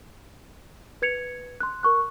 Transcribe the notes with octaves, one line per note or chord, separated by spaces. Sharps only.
B4 G#6 C#7 F7
C6 F#6
A#4 C#6 F#6